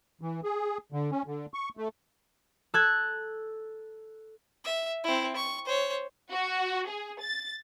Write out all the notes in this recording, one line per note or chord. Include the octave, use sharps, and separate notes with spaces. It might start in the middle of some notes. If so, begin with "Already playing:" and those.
E3
G#4
D3
C#4
D3
C#6
A3
A4 F#6 G#6
E5
C4 E4
C#6
C5 C#5
F#4
G#4
A6